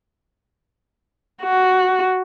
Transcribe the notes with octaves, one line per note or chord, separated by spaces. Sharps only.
F#4